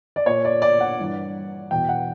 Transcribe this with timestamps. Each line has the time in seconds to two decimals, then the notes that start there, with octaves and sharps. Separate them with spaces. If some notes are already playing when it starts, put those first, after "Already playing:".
0.16 D5
0.26 A#2 C#5
0.45 D5
0.62 D5
0.81 F#5
0.99 G2 E3
1.71 E2 B2 G5
1.89 F#5